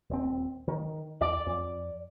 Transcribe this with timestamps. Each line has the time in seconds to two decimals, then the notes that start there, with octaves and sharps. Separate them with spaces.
0.10 D#1 C4
0.68 D#3
1.21 E2 D5
1.46 F2